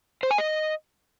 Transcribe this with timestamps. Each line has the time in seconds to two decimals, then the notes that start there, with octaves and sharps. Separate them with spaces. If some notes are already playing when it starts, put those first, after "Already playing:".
0.23 C5
0.31 G#5
0.38 D#5